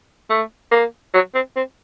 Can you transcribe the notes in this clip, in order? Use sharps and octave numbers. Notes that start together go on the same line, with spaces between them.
A3
A#3
F#3
C4
C4